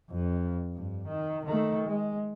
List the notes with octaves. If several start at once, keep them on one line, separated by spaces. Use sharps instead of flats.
F2
G2
D#3
D#3 A3
G#3